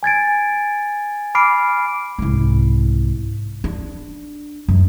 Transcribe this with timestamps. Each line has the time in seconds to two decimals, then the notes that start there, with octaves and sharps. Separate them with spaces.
0.03 G#5 G#6 A6 D7
1.35 B5 D6 F6 C7 D7
2.18 C2 G#2
3.64 D4
4.68 F#2